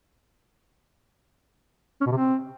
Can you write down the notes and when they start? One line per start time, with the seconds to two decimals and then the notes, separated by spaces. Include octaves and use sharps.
2.01 C#4
2.06 B2
2.12 C3
2.17 C4